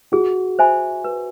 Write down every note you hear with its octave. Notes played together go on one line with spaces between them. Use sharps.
F#4 G#4
C5 E5 G#5 B5
B4